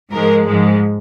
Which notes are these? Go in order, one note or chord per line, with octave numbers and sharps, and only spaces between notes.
G#2 F3 G#3 A#4
G#2 F3 G#3